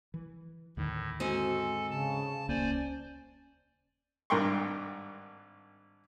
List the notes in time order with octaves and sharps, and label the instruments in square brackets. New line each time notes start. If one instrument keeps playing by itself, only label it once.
[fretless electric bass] E3
[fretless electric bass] D#2 D3 D#3 [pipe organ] A2
[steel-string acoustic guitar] G#2 C4 G#5 [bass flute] F#4 [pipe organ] A4
[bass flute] C#3 [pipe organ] A5
[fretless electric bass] D#1 C#2 A#3 [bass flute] C#4 [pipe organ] C5 D5 G#5
[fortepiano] G#1 G2 A#4 G5 C6 C#6